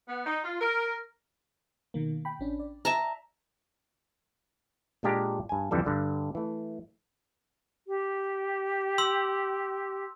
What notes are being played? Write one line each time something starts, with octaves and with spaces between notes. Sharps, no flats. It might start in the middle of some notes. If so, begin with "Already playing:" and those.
B3
D#4
F4
A#4
B2 D#3 A#3
G5 B5
A1 C#4 D4
D5
E5 A5 A#5
A#2 G#3 D4 G4 F5 A#5
G2 G#5
F2 D3 E3 G3 A4
G2 D3 G3
E3 A3
G4
C6 E6